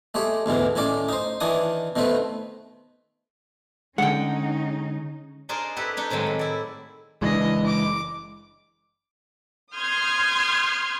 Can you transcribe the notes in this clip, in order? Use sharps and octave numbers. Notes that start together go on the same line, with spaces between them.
G#3 A3 G4 C#5
D2 G#2 B2 E3
A2 D#3 C#4 D5 D6
D#4 C5
D#3 E3 D4 G#5 D#6
B2 D#3 A3 C4 B4
D3 G#3 C#4 D#4 F#5 G5
D4 D#4 G#4 A#4 C5 D5
E4 G4 A4 B4
D4 D#4 C#5
A2 C3 D#3 F#3 G#3
B5
E4 D5
F#1 E3 G#3 D4 D#5
D6
C6 D#6 F6 G6 G#6